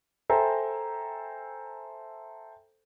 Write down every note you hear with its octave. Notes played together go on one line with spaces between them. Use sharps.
A4 C5 E5 G5 G#5 A#5